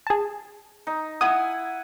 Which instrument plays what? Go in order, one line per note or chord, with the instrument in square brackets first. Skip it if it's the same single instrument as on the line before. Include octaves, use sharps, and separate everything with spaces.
[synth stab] G#4 A5
[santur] D#4
[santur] E4 G#5 [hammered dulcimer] F#5 [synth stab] D#6